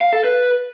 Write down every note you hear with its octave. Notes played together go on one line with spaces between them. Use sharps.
F5
A4
B4